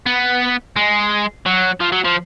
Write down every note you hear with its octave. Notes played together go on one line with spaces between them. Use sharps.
B3
G#3
F#3
F3
F#3
F3